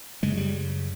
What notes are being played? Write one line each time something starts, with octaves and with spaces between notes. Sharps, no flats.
F#2 C#3 G#3
G3